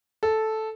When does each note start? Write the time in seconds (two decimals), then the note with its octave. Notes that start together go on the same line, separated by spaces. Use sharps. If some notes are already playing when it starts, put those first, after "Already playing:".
0.23 A4